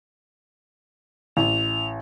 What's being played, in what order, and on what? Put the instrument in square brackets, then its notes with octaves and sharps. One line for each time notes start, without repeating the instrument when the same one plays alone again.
[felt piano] A1 [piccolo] F7